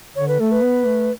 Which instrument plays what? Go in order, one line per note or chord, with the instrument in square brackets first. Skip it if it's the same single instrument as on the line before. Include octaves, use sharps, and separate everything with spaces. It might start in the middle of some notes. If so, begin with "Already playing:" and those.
[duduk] D3 [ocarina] C#5
[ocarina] B4
[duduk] A3 [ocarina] A4
[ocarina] B4
[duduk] B3
A3